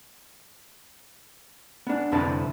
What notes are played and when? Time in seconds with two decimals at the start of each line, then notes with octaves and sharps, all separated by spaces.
1.87 B3 D4
2.11 C2 F2 D3 E4 B4 A5